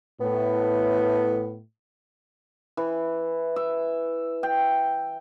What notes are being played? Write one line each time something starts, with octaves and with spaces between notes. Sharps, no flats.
A2 B3
E3
E5
G5